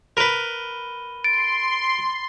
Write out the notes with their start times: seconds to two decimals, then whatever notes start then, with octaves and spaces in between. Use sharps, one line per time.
0.17 A#4 B4 B5 D#7 G7
1.24 C6 A6 D7